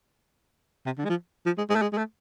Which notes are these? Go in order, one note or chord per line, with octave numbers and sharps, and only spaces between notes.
C3
D3
G#3
F3
F3
G#3
G#3
A3
G#3
G#3
A3